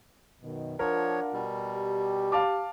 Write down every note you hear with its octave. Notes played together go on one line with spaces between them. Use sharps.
F#2 B2 D#3
F3 D4 F4 A#4 C#5 F#5
B2 G3
G4
F5 A5 D6